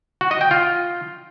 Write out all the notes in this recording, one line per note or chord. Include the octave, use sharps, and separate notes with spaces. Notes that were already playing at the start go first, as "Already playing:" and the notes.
F#4
D#5
G5
F4